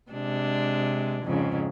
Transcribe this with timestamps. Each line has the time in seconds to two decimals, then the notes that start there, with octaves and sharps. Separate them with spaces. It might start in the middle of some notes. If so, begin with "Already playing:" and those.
0.11 C3 G#3 D4
1.23 F2 G#2 C#3